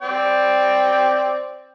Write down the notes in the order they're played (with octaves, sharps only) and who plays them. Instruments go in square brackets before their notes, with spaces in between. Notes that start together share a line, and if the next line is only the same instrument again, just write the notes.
[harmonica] C4 D5 G5